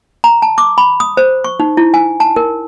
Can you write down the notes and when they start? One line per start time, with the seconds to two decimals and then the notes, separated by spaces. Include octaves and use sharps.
0.24 A#5
0.42 A5
0.58 D6
0.78 B5
1.00 D#6
1.17 C5
1.44 C#6
1.60 D#4
1.77 E4
1.94 G#5
2.20 A5
2.36 A#4